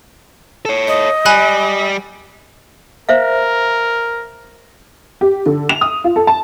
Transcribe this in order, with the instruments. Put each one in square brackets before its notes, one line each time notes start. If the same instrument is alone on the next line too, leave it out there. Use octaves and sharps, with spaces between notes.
[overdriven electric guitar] A4 C#5
[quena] D#5
[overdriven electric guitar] G3 [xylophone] G#5 B5 F#6
[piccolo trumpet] A#4 [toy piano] C5 E5 F5
[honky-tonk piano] G4
D3
F7
D#6
F4
A4
A5